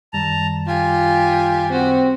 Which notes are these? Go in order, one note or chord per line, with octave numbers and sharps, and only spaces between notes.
F#2 D#3 G3 A5 A#5
F4 G4 G#5
C4 F#4 G4